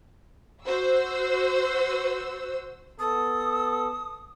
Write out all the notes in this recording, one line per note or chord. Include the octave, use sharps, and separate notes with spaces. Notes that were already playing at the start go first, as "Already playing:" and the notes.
F#4 C5 E6
B3 A4 D#6